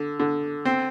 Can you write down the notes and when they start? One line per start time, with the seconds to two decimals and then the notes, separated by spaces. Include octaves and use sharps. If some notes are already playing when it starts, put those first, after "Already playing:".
Already playing: D3
0.20 D3
0.65 C4